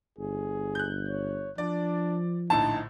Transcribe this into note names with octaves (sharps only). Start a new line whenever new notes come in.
G1 G#4
F#6 G6
C#5
F3 D4 D5
A#1 A2 D3 D#4 A5